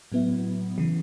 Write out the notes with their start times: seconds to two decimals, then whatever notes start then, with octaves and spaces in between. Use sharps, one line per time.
0.12 A2 F#3 B3 E4
0.78 C#3 E3